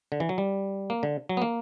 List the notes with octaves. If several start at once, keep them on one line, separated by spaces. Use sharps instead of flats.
D3
E3
F#3
G3
A#3
D3
F#3
B3
A#3